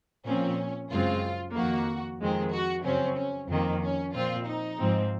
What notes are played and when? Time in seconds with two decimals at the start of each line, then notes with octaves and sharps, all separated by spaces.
0.25 A#2 F3 C4 C#4
0.90 F#2 C#3 G#3 C4 F4
1.55 F2 D#3 A#3 F#4
2.20 F2 D#3 G#3 C4
2.52 F#4
2.84 F#2 C#3 F#3 C4 C#4
3.16 C#4
3.49 F2 D#3 A#3 C4
3.81 C#4
4.14 A#2 F3 C4 F4
4.46 D#4
4.79 G#2 F3 C4